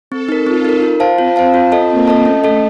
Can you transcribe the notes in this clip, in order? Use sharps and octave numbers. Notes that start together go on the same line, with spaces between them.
C4 A4
D#4 A#4
C4 F4
D#4 A#4
F4
C5 F5 A5
C4 F4
C5 F5 A5
F4
A4 D#5 A5
A#3 F4
A4 D#5 A5
A3 C#4
A4 D#5 A5